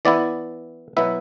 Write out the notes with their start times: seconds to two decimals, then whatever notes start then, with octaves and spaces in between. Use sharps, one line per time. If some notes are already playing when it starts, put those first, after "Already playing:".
0.05 E3 B3 E4 D5
0.97 B2 F#3 B3 E4 E5